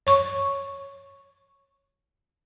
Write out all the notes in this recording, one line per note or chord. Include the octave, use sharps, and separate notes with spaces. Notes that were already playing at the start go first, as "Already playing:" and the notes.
C#5 C#6